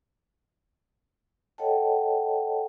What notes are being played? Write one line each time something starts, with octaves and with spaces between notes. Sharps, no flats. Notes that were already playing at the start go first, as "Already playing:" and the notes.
A4 C#5 D#5 F#5 G5 A5